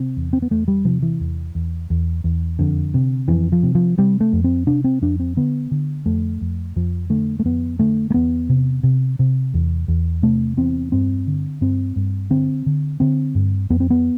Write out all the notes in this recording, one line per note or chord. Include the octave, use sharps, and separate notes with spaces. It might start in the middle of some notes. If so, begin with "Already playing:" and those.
Already playing: C3 C4
E2
C4
B3
E2 A3
G3
C3 F3
E3
E2
E2
E2
E2
F2 D3
C3
F2 E3
F3
C3
F3
C3 G3
A3
F2
C4
C3 D4
C4
F2 D4
C4
D3 B3
D3
F2 A3
F2
F2 F3
D3 A3
A3
F2 B3
D3 A3
A3
E2 B3
C3
C3
C3
E2
E2
C3 A3
E2 C4
G2 C4
D3
G2 C4
G2
D3 C4
D3
D3 C4
G2
F2 B3
C4
B3